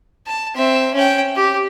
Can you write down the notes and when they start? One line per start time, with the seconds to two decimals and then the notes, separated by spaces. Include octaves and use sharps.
0.27 A5
0.56 C4 E5
0.94 C#4 G5
1.36 G4